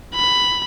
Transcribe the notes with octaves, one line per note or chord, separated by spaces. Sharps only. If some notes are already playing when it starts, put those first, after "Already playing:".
B5